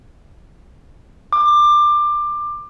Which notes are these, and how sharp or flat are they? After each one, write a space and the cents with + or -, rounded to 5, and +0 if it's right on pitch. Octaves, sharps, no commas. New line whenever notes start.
D6 +20